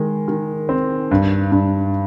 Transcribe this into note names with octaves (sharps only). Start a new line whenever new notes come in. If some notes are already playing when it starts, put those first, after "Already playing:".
Already playing: D#3 G#3
D#3
C4
G2
G2